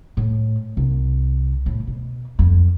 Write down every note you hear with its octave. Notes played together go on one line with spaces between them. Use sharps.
A2
C2
A2
B2
F2